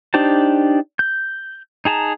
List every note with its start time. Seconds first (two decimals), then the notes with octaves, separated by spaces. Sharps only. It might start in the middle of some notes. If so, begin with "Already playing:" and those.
0.14 D4 D#4 G4 C5 A5
0.99 G6
1.85 D#4 G#4 A5 A#5